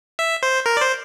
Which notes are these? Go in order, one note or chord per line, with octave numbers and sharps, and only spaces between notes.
E5
C5
A#4
D5
C5